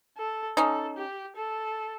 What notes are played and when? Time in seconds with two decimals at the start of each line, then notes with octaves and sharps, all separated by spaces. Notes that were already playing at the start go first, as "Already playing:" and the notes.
0.18 A4
0.57 C#4 D#4 A4
0.97 G4
1.36 A4